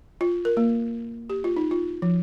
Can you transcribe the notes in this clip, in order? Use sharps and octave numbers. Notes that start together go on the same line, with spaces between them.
F4
A#4
A#3
G4
F4
D#4
F4
F3